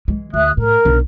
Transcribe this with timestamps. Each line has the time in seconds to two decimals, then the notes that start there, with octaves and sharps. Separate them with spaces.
0.08 E3 G#3
0.34 D2 E5 D#6 F#6
0.57 A2 A#4
0.85 B1 D4